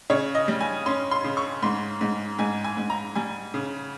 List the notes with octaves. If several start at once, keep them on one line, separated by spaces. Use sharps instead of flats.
C#3 C#5
D#5
G3
G#5
C#4 C6
C6
C#3
C#6
G#2 C6
G#2
G#2 G#5
G#5
G#2
A#5
G3 G#5
C#3